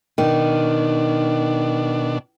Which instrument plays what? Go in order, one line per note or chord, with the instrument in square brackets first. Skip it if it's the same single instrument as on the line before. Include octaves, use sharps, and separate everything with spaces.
[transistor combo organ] B2 D4 [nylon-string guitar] D#3